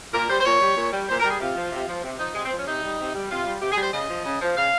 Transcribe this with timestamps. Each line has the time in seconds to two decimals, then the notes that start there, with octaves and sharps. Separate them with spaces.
0.14 A#2 A#4
0.29 G3 C5
0.40 C5
0.46 A#2 C#5
0.61 G3
0.77 A#2
0.93 G3
1.09 A#2 C5
1.20 A#4
1.24 G3
1.30 G#4
1.40 C3 F4
1.56 F3
1.72 C3
1.88 F3
2.03 C3
2.19 F3 D#4
2.35 C3 G#3
2.45 C4
2.52 F3 C#4
2.67 C3 D#4
2.83 G3
2.99 C3
3.15 G3
3.31 C3 F4
3.46 G3
3.61 C3 G4
3.72 G#4
3.77 G3
3.83 C5
3.93 C#3 D#5
4.10 F3
4.26 C#3
4.41 F3
4.57 C#3 F5